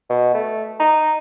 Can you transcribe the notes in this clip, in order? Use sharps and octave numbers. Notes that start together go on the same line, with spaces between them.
B2
A3
D#4